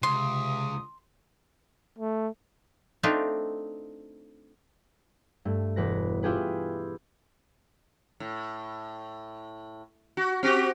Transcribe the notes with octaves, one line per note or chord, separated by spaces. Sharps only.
C#2 C3 C6 D#6
A3
A3 C4 D4 D#4 F4
G2 A3
E1 B4 A#6
E4 F4 G4 G#4 B4
A2
F#4
C4 F#4 G4